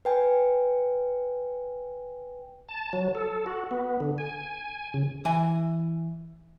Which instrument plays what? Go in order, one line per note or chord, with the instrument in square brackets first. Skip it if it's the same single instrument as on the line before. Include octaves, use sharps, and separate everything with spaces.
[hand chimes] B4 G5 G#5
[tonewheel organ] A5
F#3
A4
F#4
B3
D3
G#5
C#3
[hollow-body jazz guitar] E3 G#5